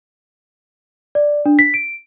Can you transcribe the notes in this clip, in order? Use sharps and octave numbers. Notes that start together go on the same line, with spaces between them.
D5
D4
B6
D7